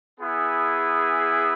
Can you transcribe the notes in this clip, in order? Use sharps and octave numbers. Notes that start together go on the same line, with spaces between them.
B3 E4 G#4